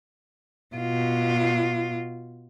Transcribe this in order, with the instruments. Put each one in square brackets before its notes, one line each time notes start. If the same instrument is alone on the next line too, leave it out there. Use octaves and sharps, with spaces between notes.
[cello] B2 F4